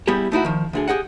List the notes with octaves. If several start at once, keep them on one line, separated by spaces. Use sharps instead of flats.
G3 B3 E4 G4 G#4
A3 D#4 E4 F#4
D#3 F3
D2 D3 G#4
G4 G#4 D#5 F#5